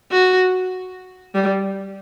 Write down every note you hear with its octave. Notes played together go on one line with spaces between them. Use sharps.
F#4
G3